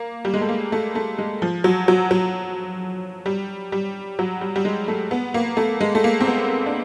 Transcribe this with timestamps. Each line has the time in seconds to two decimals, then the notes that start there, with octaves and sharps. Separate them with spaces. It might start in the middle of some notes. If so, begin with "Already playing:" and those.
Already playing: A#3
0.25 G3
0.34 G#3
0.41 A3
0.49 A#3
0.72 A3
0.95 A3
1.18 G#3
1.42 F3
1.64 F#3
1.88 F#3
2.11 F#3
3.26 G3
3.72 G3
4.19 F#3
4.41 G3
4.56 G3
4.65 G#3
4.88 A3
5.11 B3
5.34 A#3
5.57 A3
5.81 G#3
5.95 A3
6.04 A#3
6.21 C4
6.27 B3
6.66 D4